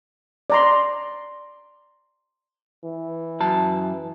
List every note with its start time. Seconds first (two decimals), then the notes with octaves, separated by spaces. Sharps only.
0.50 D5 A#5 C6
2.84 E3
3.40 F#2 F#4 A5